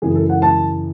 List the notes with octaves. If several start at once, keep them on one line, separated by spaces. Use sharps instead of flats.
F#2 C#3 E3 G#4
A4
F#5
A5